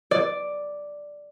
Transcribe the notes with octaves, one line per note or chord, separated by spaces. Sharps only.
D5